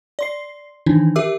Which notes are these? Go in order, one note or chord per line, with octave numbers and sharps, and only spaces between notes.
D5 C6 C7
D#3 E3 D4 D#4
G4 A#4 E5 D6 E6